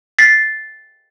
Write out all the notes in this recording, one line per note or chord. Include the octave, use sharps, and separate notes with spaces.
A6 B6 C7